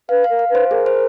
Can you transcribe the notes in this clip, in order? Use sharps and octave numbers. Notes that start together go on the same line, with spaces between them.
B4 F5
F5
A#4
F5
B4
C5
G#4 A#4
C5